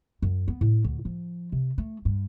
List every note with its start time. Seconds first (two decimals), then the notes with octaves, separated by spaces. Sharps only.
0.22 F#2
0.48 B3
0.61 A2
0.84 D2
1.05 F3
1.52 C3
1.78 A3
2.05 G2